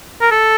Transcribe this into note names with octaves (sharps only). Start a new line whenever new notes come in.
A#4
A4